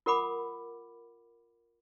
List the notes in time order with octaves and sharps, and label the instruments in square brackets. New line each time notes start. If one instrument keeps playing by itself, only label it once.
[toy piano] F4 A#4 F#5 B5 D6